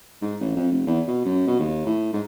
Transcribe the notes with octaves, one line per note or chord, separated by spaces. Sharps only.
G#2
A1
F2
F1
E2
B2
F#2
B2
D#2
A2
G#2